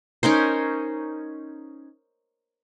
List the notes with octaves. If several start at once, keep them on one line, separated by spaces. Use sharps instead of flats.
C#4 D#4 A#4 C5